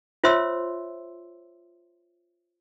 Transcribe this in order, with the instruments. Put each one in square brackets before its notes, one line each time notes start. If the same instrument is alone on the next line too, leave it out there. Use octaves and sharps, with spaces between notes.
[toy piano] F4 C5 C#5 E5 C6 E6